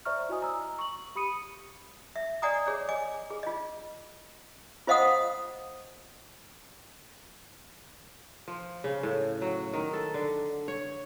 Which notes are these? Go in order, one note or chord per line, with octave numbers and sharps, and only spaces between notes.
C5 D5 E5 A#5 C#6 F6
E4 F#4 C5 D#5 G#5 D#6
A#5 E6
C#6 F#7
G4 B5 D#6 C#7 D#7
E5
D5 D#5 F#5 G#5 A#5 D#6
G#4 C#5
D#5 G#5 D6
G#4
F4 D#5
F4 C5 D#5 F5 F#5 D#6
F3
C#3
A2
F#3
D#3
A4
D3
C#5